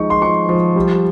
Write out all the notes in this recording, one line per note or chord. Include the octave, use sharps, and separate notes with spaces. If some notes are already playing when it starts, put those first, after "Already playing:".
Already playing: F3 G#3 D#4 C#6
C6
F3 C#6
F3
G3